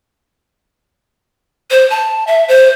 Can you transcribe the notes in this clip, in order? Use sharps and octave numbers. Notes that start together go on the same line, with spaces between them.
C5
A5
E5
C5